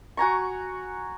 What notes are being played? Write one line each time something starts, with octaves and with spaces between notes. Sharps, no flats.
F#4 G#5 A#5 C#6